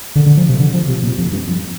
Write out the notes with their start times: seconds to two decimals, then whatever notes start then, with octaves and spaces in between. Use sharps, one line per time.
0.16 D3
0.26 D3
0.37 F3
0.49 C3
0.60 D3
0.74 F3
0.88 C3
1.03 A#2
1.18 F2
1.32 G2
1.47 F2